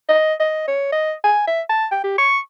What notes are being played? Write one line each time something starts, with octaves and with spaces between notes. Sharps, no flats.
D#5
D#5
C#5
D#5
G#5
E5
A5
G5
G4
C#6